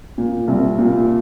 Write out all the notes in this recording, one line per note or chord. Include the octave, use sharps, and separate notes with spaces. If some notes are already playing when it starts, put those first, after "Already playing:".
A#2
C2
A#2